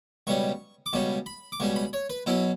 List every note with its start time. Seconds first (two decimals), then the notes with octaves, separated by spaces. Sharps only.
0.27 C#2 B2 G3 C#4 C#6
0.86 D6
0.93 C#2 B2 G3 C#4 C#6
1.26 B5
1.52 D6
1.60 C#2 B2 G3 C#4 C#6
1.76 B5
1.93 C#5
2.10 B4
2.26 B2 F#3 C#4 E4